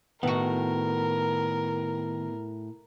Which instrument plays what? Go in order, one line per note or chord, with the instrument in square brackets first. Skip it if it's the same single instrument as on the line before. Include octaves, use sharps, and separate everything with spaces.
[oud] A2 F#4 [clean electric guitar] D#3 [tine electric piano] B3 [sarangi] A#4